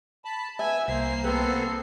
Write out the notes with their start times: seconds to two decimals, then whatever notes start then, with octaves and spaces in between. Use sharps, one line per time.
0.25 A5 B5
0.59 B3 E5 G#5 E6
0.88 C2 A#3 C5 C7
1.24 B3 C4 A4 B4 C5